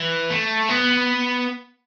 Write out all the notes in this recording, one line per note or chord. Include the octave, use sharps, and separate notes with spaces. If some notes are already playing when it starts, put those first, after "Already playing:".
Already playing: E3
A3
B3